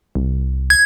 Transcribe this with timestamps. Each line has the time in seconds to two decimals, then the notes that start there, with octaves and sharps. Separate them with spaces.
0.15 C2
0.70 G#6